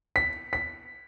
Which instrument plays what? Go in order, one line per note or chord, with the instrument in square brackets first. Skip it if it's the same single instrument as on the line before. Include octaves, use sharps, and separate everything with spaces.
[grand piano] B6
B6